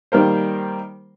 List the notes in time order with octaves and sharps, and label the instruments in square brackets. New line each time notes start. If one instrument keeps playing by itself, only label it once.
[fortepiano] D#3 G3 A#3 A#4 C5